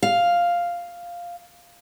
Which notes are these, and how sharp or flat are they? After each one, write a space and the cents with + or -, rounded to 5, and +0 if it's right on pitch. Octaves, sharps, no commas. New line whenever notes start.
F5 +0